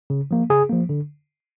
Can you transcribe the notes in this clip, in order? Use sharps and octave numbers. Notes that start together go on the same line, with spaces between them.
C#3
F3 A#3
C#3 G#4
F3 A#3
D3